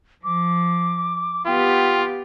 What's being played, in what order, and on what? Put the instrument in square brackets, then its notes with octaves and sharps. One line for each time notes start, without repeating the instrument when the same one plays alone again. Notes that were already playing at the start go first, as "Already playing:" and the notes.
[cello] F3 [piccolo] D6
[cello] B3 G4 [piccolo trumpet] F4 [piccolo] G5